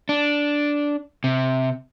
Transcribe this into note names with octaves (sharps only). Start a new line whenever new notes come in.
D4
C3